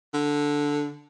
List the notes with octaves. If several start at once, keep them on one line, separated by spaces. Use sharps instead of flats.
D3